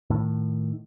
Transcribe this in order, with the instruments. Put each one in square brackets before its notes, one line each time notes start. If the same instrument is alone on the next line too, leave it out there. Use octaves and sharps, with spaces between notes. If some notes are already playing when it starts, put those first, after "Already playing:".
[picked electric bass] A2 D#3